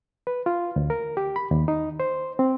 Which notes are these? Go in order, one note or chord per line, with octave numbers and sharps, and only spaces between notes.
B4
F4
D2
A#4
G4
B5
D#2
D#4
C5
C4